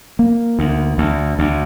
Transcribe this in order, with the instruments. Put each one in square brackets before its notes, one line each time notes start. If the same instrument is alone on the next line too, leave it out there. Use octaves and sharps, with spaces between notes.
[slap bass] A#3
D2
D2
D2